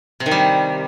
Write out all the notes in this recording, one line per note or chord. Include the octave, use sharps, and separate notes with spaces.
C3
D#3
G3